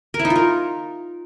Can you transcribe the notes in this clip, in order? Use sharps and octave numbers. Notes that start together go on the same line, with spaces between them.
A#4
E4
D#4
F4
A#4